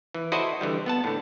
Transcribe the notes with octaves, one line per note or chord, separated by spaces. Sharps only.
E3
E4 F#4 A4 C5 D5 D#5
D3 E3 G3
B3 F#5 A5
A2 D3